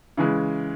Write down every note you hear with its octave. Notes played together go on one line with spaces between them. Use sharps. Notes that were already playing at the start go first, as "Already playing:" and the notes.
C#3 E3 G#3